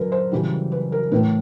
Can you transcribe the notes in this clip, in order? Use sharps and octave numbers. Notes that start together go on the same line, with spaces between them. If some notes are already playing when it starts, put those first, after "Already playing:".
Already playing: F#2 D3 F#3 A#4 B4
C5
F#2 C#3 E3 G3
B4
A#4
A2 E3 A3 B4